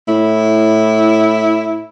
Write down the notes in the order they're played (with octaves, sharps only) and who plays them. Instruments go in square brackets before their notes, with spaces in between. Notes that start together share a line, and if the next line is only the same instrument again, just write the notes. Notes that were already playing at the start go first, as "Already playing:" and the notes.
[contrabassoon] A2 [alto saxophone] E4